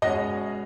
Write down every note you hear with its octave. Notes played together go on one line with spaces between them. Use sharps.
B2 G#3 C#4 D#5